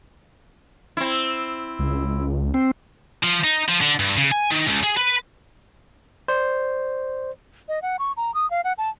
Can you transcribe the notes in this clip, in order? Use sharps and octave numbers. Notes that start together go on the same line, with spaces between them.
C4 E4
C#2
C4
F3
D#4
F3
D3
G2
C#3
G#5
D#3
C#2
G#4
B4
C5 D5
D#5
F#5
C#6
A#5
D#6
F5
F#5
A5